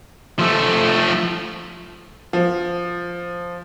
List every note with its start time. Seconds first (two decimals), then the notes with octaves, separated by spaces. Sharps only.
0.39 F3 A3
2.33 F3